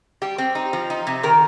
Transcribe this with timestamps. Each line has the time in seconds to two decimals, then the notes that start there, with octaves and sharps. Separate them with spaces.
0.22 G3 G4
0.38 C4
0.55 D#4
0.73 F3
0.90 D#4
1.07 C3
1.23 D#3 A#4